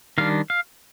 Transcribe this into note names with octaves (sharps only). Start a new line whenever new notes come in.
D#3 G3 D4 F5
F5